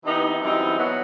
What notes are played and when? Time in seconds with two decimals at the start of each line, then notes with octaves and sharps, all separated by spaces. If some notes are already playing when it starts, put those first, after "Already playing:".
0.05 C3 E3 B3 D#4
0.42 F#2 E3 G3 C4 D#4
0.78 B2 F#3 B3